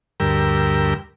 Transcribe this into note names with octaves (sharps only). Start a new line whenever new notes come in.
D2 G2 G4 A#4 E6